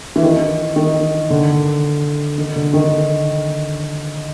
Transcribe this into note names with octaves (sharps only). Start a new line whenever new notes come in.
E3
D#3
D#3
D3
D#3
D3
D#3